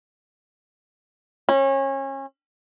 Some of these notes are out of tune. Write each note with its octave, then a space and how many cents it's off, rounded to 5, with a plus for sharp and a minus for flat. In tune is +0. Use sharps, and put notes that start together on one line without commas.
C#4 -30